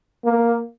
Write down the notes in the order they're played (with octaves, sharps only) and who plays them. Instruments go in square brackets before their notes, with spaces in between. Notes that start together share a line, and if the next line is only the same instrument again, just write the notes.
[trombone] A#3